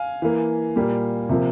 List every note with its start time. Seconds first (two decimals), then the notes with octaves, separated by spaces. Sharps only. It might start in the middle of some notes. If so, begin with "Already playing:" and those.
Already playing: F5 G#5
0.22 E3 A#3
0.76 A#2 G3 A#3
1.29 C3 F3 A#3